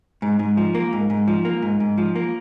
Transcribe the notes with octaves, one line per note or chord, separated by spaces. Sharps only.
G#2
G#2
F3
A#3
G#2
G#2
F3
A#3
G#2
G#2
F3
A#3